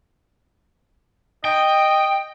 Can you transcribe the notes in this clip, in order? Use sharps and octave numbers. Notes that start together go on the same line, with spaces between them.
D#5 G5